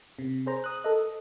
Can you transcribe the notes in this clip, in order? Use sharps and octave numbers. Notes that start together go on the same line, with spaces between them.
C3
G#4 C5 A#5
D#6 F#6
A4 D#5